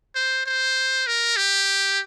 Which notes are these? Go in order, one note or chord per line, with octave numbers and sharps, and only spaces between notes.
C5
C5
A#4
G4